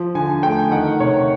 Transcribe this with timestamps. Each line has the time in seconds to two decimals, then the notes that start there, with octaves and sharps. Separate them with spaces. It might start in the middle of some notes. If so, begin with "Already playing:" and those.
Already playing: F3
0.15 D3 G#5
0.43 A3 G5
0.71 D#3 F#5
1.00 C3 C#5